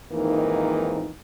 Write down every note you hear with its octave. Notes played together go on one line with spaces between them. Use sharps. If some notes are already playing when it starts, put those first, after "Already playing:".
F2 G#2 D#3 E3 A#3 D#4